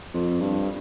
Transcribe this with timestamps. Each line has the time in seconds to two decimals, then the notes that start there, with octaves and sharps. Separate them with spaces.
0.14 F2
0.41 G2